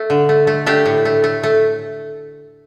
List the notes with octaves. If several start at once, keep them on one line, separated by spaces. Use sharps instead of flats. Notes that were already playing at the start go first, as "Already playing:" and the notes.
Already playing: A3
D3
A3
A3
A3 D4 G4
A2
A3
A3
A3